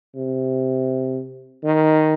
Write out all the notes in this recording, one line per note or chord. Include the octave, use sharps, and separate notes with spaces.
C3
D#3